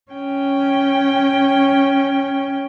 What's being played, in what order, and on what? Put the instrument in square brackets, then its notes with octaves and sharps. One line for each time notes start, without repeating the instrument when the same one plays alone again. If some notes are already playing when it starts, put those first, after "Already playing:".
[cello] C#4 G5